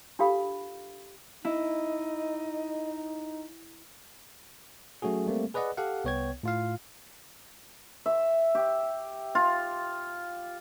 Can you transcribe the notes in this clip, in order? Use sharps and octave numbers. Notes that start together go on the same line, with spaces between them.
D4 F4 G4 A4 F5 B5
D#4 E4 D#5
F#3 A3 C#4 F#4 G#4
G3 A3 A#3 C4
G#4 B4 D5 D#5 F#5
G4 A4 F5 F#5
C2 B3 C#5 G5 G#6
A2 F4 F5
E5
G4
F4